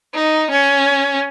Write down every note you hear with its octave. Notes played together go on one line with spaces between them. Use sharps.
D#4
C#4